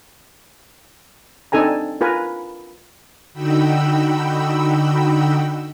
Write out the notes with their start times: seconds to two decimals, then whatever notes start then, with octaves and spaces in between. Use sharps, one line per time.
1.52 C4 D4 D#4 A4 G#5 A#5
2.01 F4 A#4 B4 G#5
3.33 D3 D#4 F#4 G5 B5 E6